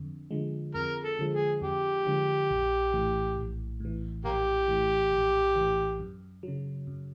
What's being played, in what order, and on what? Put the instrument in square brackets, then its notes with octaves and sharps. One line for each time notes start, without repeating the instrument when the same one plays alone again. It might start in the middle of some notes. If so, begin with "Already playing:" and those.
Already playing: [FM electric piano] F2 D3
D3 F3 G#3
[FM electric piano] F2 [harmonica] A#4
[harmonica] A4
[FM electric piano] D3 F3 G#3
[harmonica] G#4
[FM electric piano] F2 [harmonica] G4
[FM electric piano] D3 F3 G#3
A#1
A2 E3
A#1
A2 E3
[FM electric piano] A#1 [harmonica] A#3 G4
[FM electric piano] A2 E3
A#1
A2 E3
F#2
C#3 F#3
F#2